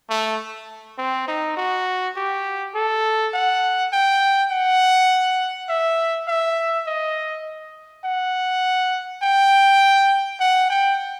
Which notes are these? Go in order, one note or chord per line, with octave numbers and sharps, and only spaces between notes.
A3
C4
D#4
F#4
G4
A4
F#5
G5
F#5
E5
E5
D#5
F#5
G5
F#5
G5